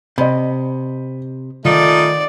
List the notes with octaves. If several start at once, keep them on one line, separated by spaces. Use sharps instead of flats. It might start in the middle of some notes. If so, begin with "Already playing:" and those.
C3 D#5 B5
D#3 A3 D#4 F4 D5